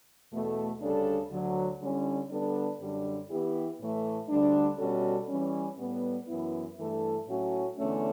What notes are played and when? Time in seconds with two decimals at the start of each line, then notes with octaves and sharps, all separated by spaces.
0.31 E2 B2 A3
0.81 D2 C#3 G3 D4 A4
1.30 D2 D3 F#3
1.80 D3 G3 C#4 E4
2.29 D3 G3 B3 D4 A4
2.80 F#2 D3 G3 D4
3.29 E3 B3 E4 G4
3.79 A2 E3 A3
4.28 D2 D3 G3 D4
4.78 B2 G3 C#4 F#4 A4
5.28 E3 G3 C#4
5.78 A2 G3 B3
6.27 F#2 E3 B3 E4
6.77 G2 E3 A3 E4 A4
7.27 A2 F#3 A3 C#4 F#4
7.77 E2 D3 A3 C#4